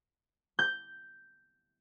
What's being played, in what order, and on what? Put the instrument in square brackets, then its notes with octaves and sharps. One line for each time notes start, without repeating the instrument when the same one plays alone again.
[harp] G6